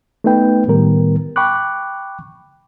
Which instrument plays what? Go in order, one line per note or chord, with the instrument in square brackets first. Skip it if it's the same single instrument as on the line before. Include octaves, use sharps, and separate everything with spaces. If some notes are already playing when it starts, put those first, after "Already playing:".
[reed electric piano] A3 B3 D#4 B4 G5
A2 D#3 G3 B3 A#4
G5 B5 C#6 D6 F#6